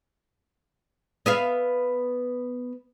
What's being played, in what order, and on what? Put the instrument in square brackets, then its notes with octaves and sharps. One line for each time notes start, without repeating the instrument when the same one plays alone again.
[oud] B3 E5 F5